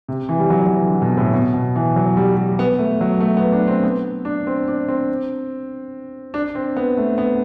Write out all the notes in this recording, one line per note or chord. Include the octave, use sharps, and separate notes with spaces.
C3
E3
G3
F#3
F#3
E3
D3
B2
A2
B2
B2
E3
F#3
G3
G3
B3
A3
F#3
A3
B3
D4
C4
B3
D4
C4
D4
C4
D4
C4
B3
A3
B3